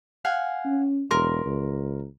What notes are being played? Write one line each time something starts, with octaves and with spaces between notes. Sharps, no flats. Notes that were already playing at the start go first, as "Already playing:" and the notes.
F5 F#5 G#5
C#4
E1 A#4 C6
C#2